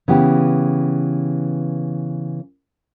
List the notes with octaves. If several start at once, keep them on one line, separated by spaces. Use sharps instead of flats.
C#3 E3 B3 G4